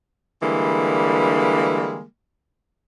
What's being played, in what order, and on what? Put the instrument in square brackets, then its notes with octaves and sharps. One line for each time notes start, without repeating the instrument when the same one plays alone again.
[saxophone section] D3 E3 G3 G#3 A#3